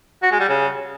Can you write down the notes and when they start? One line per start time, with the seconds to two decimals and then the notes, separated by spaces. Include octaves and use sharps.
0.23 F#4
0.31 G#3
0.40 G3
0.49 C#3